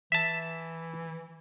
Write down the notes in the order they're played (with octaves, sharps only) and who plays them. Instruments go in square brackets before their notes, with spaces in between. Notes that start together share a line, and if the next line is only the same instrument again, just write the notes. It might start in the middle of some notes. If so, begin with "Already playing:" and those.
[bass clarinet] E3 [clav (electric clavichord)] E5 A5